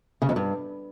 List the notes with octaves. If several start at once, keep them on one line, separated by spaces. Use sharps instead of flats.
C#3
F2
G2